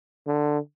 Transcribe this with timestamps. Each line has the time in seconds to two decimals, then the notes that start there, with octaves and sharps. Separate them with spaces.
0.27 D3